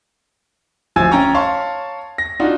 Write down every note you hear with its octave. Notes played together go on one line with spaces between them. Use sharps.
D1 F3 G#5 E6 G#6 A6
C#4 G5 A#5 C#6
C#5 F5 A5 C6 C#6
A#6
D4 D#4 F4 F#4